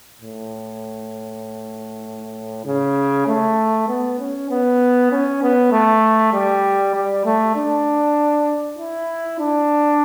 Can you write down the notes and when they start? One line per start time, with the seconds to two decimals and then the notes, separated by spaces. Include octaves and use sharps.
0.21 A2
2.66 C#3
3.28 A3
3.88 B3
4.19 C#4
4.50 B3
5.12 C#4
5.42 B3
5.72 A3
6.33 G3
6.95 G3
7.25 A3
7.56 D4
8.79 E4
9.40 D4